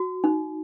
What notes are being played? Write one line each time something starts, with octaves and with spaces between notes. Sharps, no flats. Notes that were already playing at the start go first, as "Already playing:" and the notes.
Already playing: F#4
D#4